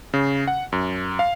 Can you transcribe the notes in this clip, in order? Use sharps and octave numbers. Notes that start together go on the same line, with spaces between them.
C#3
F#5
F#2
F5